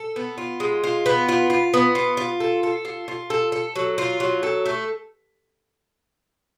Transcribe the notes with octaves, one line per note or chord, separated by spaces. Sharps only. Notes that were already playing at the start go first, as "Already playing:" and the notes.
Already playing: A4
B3
F4
G#3
F4
B3
F4
F4
B3
F4
F4
A4
A4
F4
F4
A4
A4
F#3
F4
F#3
A4
A3